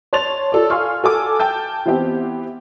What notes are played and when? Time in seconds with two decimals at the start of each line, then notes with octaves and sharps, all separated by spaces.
0.13 C#5 A5 C6 A6 F7
0.52 F4 A4 D5
0.70 F5 G#5 C6 C#6 F6
1.03 F#4 A4 G#5 D6
1.40 G5 A5 G6
1.86 E3 B3 C4 E4 G4